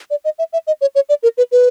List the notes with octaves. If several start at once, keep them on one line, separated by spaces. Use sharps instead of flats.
D5
D#5
E5
E5
D#5
C#5
C#5
D5
A#4
B4
B4